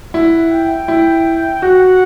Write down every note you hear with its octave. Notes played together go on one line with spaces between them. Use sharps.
E4 F#5
G5
E4
F#4 F#5